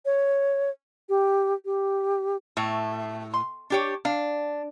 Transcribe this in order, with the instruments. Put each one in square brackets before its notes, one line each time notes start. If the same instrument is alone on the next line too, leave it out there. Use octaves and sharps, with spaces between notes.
[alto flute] C#5
G4
G4
[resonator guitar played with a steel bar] A2 [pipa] A3
[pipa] C6
[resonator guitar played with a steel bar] D4 G4 C#5
[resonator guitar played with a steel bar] D4 [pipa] F5